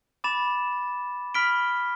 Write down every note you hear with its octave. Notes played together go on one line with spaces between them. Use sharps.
B5 D6 A6 E7
B5 F6 B6 D7 G7